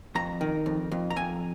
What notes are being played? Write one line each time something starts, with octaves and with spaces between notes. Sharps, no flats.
F2 A#5
D#3
F2
F2
A#5
F2 G#5